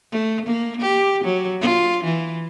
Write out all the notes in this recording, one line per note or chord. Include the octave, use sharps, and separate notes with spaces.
A3
A#3
G4
F#3
F4
E3